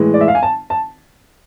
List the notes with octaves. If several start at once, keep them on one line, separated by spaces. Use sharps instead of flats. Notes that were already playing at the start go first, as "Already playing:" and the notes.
Already playing: A2 E3 G#3
D5
E5
F5
G#5
A5
A5